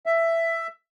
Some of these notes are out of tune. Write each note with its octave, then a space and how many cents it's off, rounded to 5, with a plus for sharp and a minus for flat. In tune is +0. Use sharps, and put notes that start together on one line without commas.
E5 +10